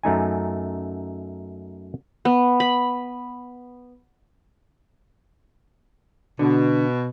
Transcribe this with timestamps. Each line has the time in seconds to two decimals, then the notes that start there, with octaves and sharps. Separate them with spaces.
0.03 F#2 A3 D#4 G#5
2.25 B3
2.60 B5
6.39 B2 D3